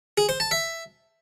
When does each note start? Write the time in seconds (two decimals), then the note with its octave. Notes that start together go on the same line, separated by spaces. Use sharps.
0.18 G#4
0.29 C5
0.40 A5
0.51 E5